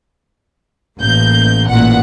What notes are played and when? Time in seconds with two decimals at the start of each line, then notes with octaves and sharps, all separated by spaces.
0.98 A1 A#3 G6
1.69 A1 A#2 F#5